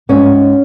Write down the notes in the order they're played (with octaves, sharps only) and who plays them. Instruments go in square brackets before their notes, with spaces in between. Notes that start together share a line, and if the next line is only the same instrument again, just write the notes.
[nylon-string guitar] G#2 C#4